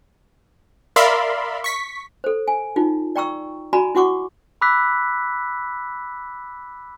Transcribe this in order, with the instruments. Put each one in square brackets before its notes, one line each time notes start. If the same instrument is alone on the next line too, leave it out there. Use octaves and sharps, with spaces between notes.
[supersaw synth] A#4 D5 E5 F5 B5 C6
C#6 B6
[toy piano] A4 C5
G#5
D#4 F4
D5 G5 A#5 C#6 E6
F#4 D5 G#5 A#5 B5
E4 F#4 F#5 C#6 D6
[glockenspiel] B5 D6 E6 F#6 B6